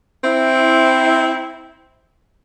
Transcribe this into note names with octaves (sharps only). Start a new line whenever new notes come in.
C4 E4